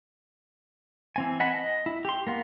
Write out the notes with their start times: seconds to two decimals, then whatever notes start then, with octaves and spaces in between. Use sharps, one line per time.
1.16 E3 C4 G#5
1.40 D#5 F#5 G#5 A5 B5
1.55 D#5
1.86 E4
2.05 G4 C6
2.27 A#3 B3 F5